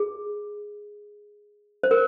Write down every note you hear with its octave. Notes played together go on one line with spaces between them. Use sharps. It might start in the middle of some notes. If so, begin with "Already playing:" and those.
Already playing: G#4
C5
A#4